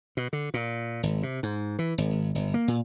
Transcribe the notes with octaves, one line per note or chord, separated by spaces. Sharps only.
B2
D3
A#2
G#1
C3
G#2
E3
G#1
G1
A#3
A#2